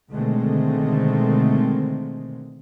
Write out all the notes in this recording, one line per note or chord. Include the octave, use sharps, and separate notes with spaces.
B2 D3 D#3 G#3 A3 C4